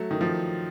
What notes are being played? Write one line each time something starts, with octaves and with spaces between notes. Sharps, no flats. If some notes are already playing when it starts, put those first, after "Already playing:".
Already playing: F#3 A3
D#3
F3